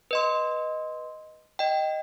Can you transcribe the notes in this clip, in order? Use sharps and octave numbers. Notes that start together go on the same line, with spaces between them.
B4 D#5 C6
D#5 G5